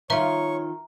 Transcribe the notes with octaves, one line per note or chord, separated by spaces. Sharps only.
D#3 F4 B4 C#5 E5 A#5